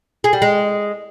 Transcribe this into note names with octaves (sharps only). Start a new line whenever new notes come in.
G#4
G3
G#3